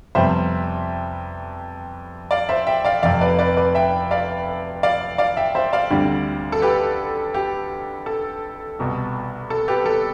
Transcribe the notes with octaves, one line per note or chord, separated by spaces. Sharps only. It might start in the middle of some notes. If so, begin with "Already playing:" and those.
F2 C3 G3 B3 C5 E5
D5 F5
C5 E5
E5 G5
D5 F5
F1 F2 C3 D5 F5
B4 D5
B4 D5
B4 D5
E5 G5
D5 F5
D5 F5
D5 F5
E5 G5
C5 E5
D5 F5
D2 D3 G3 C4
A4
G4 B4
G4
A4
C2 B2 B3
A4
G4 B4
A4